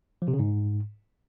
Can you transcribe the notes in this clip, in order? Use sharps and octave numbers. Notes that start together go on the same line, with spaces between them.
F3
C3
C#3
G#2